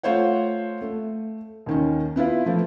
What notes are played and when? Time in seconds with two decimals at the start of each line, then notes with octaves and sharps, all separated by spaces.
0.03 A3 F4 C5 C#5 F#5
0.82 A3
1.66 D#2 D#3 C#4
2.16 B3 E4 F4 B4
2.46 F3 A3